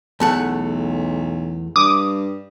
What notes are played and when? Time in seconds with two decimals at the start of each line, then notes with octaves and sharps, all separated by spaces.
0.20 B1 E2 A3 F#5
1.76 G2 D6 D#6